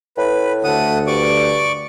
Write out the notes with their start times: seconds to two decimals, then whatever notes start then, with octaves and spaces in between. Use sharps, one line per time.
0.18 A2 B4
0.64 D2 A3 F#5 D#6
1.07 G2 D5 C#6 D6